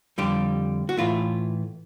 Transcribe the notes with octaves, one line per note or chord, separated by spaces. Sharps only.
F2 D3 G3 G4
F#4
A2 E3 A3 F4